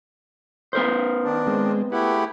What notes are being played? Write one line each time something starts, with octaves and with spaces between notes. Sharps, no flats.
B3 A#4 C5
D#3 D4
G#3 C4
A3 E4 G4 G#4 B4 F#5